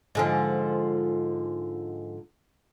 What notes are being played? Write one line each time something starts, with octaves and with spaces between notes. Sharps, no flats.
G#2 D3 F3